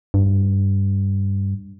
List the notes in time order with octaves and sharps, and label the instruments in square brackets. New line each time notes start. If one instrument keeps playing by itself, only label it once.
[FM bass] G2